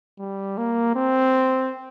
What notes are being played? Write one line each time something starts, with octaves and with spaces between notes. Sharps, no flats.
G3
A#3
C4